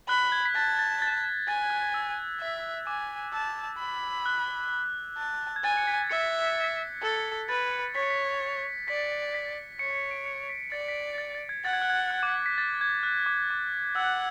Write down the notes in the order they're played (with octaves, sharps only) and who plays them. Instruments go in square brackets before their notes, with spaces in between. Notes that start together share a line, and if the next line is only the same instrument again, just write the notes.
[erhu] B5 [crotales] F#6
[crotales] G#6
B6
[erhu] A5 [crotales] A6
[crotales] A6
A6
[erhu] G#5 [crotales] A6
[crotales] F#6
E6
[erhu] E5
[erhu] G#5 [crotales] D6
[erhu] A5 [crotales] E6
[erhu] B5
[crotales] F#6
[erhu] A5
[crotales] G#6
[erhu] G#5 [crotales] A6
[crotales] C#7
B6
[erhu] E5 [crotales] C#7
[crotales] A6
B6
A6
[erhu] A4
[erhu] B4 [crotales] A6
[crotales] C#7
[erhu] C#5 [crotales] B6
[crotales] C#7
B6
[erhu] D5 [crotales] B6
[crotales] B6
[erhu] C#5 [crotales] C#7
[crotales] C#7
D7
C#7
B6
[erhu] D5 [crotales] A6
[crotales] B6
B6
A6
A6
G#6
[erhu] F#5 [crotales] A6
[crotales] G#6
F#6
G#6
F#6
D6
B6
A6
G#6
F#6
D6
D6
[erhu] F#5 [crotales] E6